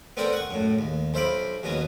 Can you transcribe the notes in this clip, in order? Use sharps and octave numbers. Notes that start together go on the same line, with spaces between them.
B3 C4 D4 A4 A#4 C5
F#5 C#6
F#2 A2
D#2
B1 C5 E5 F5 B5 D6
D#2 B2 F#3 B3 C#4